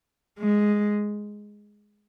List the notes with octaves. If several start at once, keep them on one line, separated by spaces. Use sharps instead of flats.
G#3